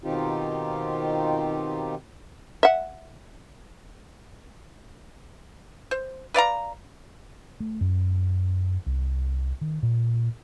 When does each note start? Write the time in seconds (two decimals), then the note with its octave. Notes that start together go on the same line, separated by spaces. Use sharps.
0.04 B2 D#3 C4 D#4 F4 G4
2.63 E5 F#5
5.91 C5
6.34 B4 D5 F5 A#5
7.60 A3
7.81 F#2
8.86 C2
9.61 D#3
9.83 A#2